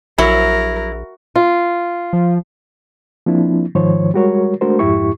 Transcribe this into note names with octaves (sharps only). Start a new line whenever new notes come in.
A#1 F#3 E4 A#4
F4
F3
F3 A#3 C4 D4 E4
G#2 D#3 F3 C5 C#5
G3 G#3 F#4 A#4 C#5
G#3 A3 D4 F#4 A#4 C5
F2 G#2 E4 G4 C#6